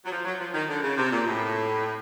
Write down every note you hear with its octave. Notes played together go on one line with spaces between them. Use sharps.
F#3
F3
F#3
F3
D#3
D3
C#3
C3
A#2
A2